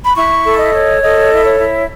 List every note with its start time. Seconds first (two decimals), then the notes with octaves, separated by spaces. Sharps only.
0.05 B5
0.15 E4 C#6
0.44 A4
0.59 D#5
0.73 C#5
1.02 A4 D#5
1.31 E4
1.45 C#5
1.59 E4